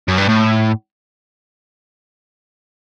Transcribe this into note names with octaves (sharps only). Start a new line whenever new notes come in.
F#2
G2
A2